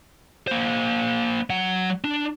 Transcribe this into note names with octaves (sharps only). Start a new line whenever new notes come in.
A#3 C5
F#3 F#5
D4